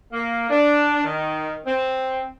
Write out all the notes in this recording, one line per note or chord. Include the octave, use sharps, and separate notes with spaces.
A#3
D4
D#3
C4